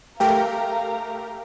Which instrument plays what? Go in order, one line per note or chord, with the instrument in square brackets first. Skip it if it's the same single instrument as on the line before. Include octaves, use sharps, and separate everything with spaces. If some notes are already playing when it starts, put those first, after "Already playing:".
[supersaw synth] A3 G4 A#4 [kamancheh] F5 A#5 [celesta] G5